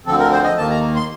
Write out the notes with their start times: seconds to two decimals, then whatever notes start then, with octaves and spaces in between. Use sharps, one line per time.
0.06 D2 D3 F3 C4 A4
0.19 A#4
0.32 C5
0.44 D#5
0.57 D#2 D#3 A#3 A5
0.70 A#5
0.96 C6